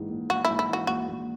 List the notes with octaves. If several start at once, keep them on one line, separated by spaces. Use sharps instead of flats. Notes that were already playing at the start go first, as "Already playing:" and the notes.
Already playing: A#1 G#2 E3
A#1
A#1 F#4
G#2 E4
E4
E3 F#4
A#1 F#4
A#1